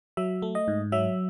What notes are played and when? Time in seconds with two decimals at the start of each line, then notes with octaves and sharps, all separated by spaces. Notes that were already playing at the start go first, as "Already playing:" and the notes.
0.17 F#3 E5
0.42 A3
0.55 D#5
0.68 G#2
0.92 F#3 E5